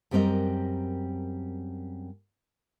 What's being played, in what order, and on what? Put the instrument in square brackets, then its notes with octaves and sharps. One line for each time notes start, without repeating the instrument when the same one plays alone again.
[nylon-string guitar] F#2 G3 C4 D4 A#4 D#5